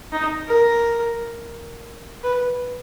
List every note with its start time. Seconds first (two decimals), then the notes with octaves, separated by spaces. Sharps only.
0.12 D#4
0.47 A#4
2.23 B4